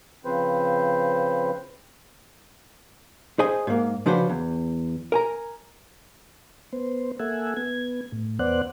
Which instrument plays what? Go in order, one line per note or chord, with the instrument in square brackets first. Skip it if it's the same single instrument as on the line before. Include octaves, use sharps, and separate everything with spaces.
[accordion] C#3 F3 C4 B4 C5
[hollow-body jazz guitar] G#4 C5 D#5 G#5
G#2 A#3
C#3 F3 D4 F#4 B4 C5
E2
A#4 G#5 A#5
[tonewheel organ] B3 C5
A#3 A4 E5 F#5 G#5
B3 G#6
A2
E2 B3 C5 D5 F#5 F#6